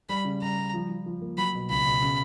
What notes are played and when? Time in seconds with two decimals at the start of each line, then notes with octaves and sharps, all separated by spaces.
0.09 G3 B5
0.25 C#3
0.42 G3 A#5
0.58 G3
0.74 F3
0.90 F3
1.06 F3
1.21 A#3
1.37 F#3 B5
1.55 B2
1.70 C#2 B5
1.86 B2
2.02 C#3